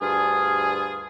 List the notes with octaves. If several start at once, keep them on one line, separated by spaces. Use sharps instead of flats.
D2 G2 F4 G#4